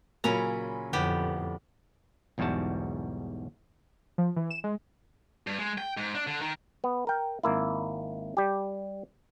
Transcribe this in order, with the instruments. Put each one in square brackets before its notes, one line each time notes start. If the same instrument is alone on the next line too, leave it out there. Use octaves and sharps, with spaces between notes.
[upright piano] A#2 F#3 A#3 [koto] C#3 C#4 A#5 [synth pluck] G#5 B5
[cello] F2 [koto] A2 B3 G4 [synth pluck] D3
[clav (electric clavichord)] B1 E2 G#2 G3 F#4 A5
[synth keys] F3
E3
E7
G#3
[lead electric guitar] G2
G#3
G5
G#2
D4
D3
D#3
[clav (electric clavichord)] B3
A#4 G5
G#1 A#3 E4
G3 G4